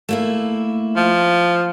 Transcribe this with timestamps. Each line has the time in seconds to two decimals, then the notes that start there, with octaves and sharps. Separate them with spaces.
0.09 A3 A#3 E4
0.96 F3